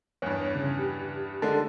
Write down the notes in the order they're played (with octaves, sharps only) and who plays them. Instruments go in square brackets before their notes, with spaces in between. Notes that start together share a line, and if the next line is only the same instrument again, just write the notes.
[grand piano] E2 G2 [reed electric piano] C#5
[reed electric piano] C#3
G4
[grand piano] D3 G#3 [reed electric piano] D4 A4 A5